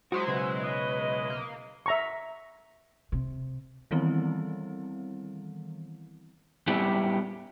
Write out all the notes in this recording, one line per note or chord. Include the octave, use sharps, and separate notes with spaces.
F#3 G#3 E4 F#4 C5
B1 C#3 B4
D#5
A#3
E5 A#5 C#6
C3
D#3 E3 G3 B3 C4 E4
G3 B3 E4 G4